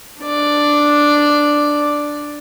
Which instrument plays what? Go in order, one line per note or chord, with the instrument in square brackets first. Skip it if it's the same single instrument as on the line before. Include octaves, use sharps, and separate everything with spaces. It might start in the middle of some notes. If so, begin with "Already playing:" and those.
[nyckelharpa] D4 D5